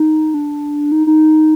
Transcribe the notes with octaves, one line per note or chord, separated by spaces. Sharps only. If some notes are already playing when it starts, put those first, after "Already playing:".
Already playing: D#4
D4
D#4
D#4